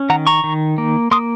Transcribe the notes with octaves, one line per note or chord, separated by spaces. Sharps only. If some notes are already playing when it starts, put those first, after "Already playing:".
Already playing: C#4
D#3 F#5 A#5
A#5 C#6
D#3
A#3
A#3 C6 D#6